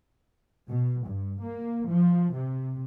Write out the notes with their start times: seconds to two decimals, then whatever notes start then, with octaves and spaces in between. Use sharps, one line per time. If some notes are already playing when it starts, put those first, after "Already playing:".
0.68 B2
1.05 G2
1.40 A#3
1.88 F3
2.35 C3